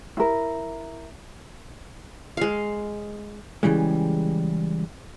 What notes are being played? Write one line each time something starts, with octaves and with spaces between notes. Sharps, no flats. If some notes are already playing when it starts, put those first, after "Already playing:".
E4 A#4
G#3 F5
C#3 E3 G3 G#3